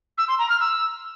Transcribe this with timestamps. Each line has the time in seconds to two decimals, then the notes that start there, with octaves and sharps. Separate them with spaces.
0.17 E6
0.28 C6
0.38 A#5
0.49 F6
0.59 E6